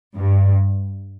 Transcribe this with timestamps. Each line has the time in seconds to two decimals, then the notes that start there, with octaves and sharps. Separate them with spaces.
0.16 G2